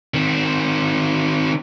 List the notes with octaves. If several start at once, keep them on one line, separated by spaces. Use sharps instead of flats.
D#3 C4